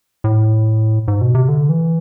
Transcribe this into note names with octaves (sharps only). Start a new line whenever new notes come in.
A2
G#2
B2
C3
D3
E3